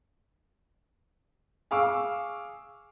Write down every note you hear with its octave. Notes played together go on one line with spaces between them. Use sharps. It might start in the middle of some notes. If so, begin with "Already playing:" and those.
G#4 F5 C#6 D6 E6